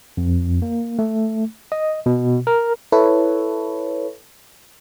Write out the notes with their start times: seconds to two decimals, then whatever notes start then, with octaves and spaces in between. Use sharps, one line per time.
0.17 F2
0.62 A#3
0.99 A3
1.72 D#5
2.06 B2
2.47 A#4
2.92 E4 A4 B4 C#5